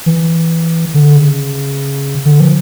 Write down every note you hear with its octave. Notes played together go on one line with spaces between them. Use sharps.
E3
D3
C#3
D3
F3